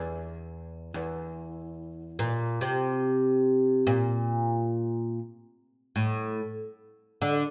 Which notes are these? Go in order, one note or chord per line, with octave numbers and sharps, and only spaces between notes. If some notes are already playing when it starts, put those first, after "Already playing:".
Already playing: E2
E2
A#2
C3
A#2
A2
D3